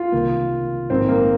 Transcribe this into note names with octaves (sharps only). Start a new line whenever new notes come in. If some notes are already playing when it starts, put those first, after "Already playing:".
Already playing: F4
C2 C3 D#3 A#3
A#1 G#2 D#3 C4
A#3